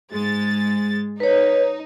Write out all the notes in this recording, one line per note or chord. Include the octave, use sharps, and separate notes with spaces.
G#2 G#3 A6
D#4 B4 C#5